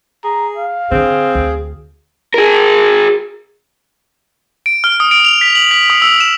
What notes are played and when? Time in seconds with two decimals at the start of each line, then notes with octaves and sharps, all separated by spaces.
0.24 G#4 A#5
0.57 F5
0.91 D3 C4 G#4
1.35 D2
2.34 G#4 A#4
4.66 D7
4.84 F6
5.00 D#6
5.11 D7
5.25 F7
5.41 B6
5.55 F#7
5.71 B6
5.90 D#6
6.02 E6
6.20 E7